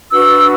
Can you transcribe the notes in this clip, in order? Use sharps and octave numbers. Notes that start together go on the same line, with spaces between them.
D4 F#4 B4 E6